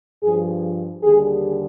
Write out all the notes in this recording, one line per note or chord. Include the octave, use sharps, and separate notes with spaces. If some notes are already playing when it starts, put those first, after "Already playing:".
G2 F3 G#4
D#2 D3 G3 G#4